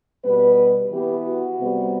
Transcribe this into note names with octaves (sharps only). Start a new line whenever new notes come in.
B2 G3 B3 B4
E3 B3 G4
F#4
C3 G3 B3